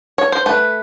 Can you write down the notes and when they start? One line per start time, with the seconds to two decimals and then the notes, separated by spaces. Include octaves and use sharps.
0.18 C#5
0.32 C5
0.46 A3 B4